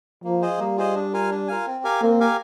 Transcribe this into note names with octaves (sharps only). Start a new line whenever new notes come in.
F3 A#3
F4 G#4 C5 D#5
G3 A#3
F4 G#4 C5 D#5
D4
F4 A#4 F5 G#5
D4
F4 A#4 F5 G#5
C4
G4 A#4 F5 G#5
A#3 C4
G4 A#4 F5 G#5